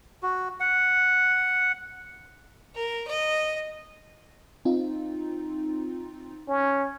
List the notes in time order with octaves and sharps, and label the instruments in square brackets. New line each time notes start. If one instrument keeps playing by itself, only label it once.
[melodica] F#4
F#5
[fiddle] A#4
D#5
[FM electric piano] C4 D#4 F4
[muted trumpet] C#4